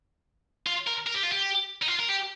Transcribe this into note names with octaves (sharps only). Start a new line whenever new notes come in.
F4
A#4
A#4
G4
F4
G4
D#4
F4
A#4
G4